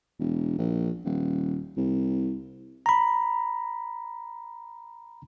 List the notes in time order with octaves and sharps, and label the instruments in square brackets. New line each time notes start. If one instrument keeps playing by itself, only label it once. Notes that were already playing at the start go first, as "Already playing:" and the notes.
[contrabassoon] E1
A#1
D#1
C2
[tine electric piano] A#5 B5